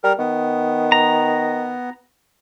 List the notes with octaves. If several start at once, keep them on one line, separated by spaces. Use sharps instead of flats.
G3 A#4
D#3 B3
A#5